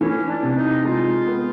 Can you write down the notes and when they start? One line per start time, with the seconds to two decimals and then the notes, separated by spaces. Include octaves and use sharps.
0.01 E3 C#4
0.29 D4
0.43 C3
0.56 D#4
0.85 G#3 F4
1.27 B3